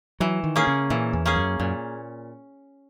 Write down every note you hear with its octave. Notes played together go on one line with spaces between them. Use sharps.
E3 F#3
D#3
A#3 C#4 G#4
C#3
A#2 E3
E2
A#3 C#4 G#4
F#2
F#2 A#2